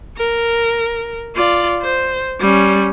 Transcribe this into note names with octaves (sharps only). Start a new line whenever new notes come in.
A#4
F4 D5
C5
G3 C#4